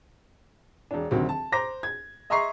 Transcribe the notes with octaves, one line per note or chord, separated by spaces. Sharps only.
E1 D4
D2 C3 D#3 F#3 C4
A5
C5 A#5 D6 A#6
G#6
D#5 E5 A#5 C6 C#6 C7